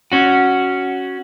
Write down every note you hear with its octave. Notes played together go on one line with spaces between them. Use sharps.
C#4 F#4